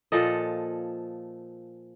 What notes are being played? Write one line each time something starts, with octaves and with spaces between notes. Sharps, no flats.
A#2 F3 A4 D#5